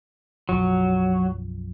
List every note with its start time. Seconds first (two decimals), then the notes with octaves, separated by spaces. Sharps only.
0.49 B1 F#2 F3 F#3